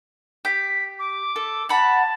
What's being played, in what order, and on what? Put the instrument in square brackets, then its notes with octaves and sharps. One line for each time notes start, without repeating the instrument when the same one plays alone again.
[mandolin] G4 [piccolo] B6
[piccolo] D6
[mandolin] A4
[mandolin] F#5 B5 [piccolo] A5